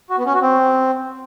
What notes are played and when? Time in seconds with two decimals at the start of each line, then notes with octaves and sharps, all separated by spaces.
0.10 F#4
0.18 B3
0.26 C#4
0.34 F#4
0.42 C4